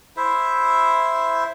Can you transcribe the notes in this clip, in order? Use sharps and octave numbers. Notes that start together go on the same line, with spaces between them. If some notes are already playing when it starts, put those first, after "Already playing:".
E4 C5 E5